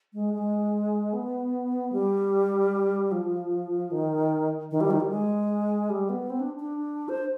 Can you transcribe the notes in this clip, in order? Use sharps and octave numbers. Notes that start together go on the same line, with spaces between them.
G#3
G#3
B3
G3
F3
D#3
D#3
G3
D#3
G3
G#3
G3
B3
C4
D4
D4
C5